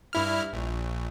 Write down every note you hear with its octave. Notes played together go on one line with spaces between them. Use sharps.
G2 E4 F6
A#1